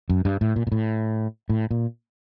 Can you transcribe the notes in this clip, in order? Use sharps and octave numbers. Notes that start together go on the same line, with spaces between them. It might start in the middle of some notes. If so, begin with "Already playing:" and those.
F#2
G2
A2
A#2
A#2
A2
A2
A#2